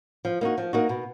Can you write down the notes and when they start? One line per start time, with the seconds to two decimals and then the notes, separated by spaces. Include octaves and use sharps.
0.25 F3
0.41 A#3 D#4 F#4
0.58 F3
0.73 A#3 D#4 F#4
0.89 B2